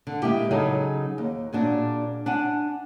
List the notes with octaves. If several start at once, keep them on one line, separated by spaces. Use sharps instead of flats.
D3
G#3 A#3 E4 G4
C#3 F#3 D#4 G#4 A4
D#2
A#2 D4 F#4 G#4
D4 F#5 G#5